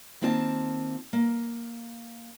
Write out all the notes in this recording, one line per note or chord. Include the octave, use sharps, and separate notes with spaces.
D#3 A#3 C4 F4 E5 A5
A#3